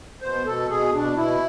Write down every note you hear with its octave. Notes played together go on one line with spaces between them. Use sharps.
B2 C5
B2 A4
B2 G#4
B2 D4
B2 E4